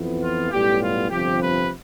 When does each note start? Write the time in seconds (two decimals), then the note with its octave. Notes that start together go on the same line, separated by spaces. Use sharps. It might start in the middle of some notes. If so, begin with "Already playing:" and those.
Already playing: F2 E3 B3
0.21 F4
0.51 B1 A2 G3 B3 G4
0.81 F4
1.10 G1 F2 C3 F3 C4 G4
1.42 B4